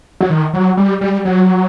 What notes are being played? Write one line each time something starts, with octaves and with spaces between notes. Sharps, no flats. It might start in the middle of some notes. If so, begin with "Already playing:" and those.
F#3
D#3
F#3
G3
G3
F#3